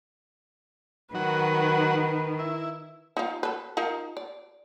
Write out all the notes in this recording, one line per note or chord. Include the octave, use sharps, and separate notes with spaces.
D#3 F#3 F#4 B4
E4
D#4 F4
A4 B4
D#4 F4 A#4
D5